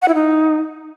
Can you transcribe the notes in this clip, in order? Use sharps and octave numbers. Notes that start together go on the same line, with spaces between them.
F#5
E4
D#4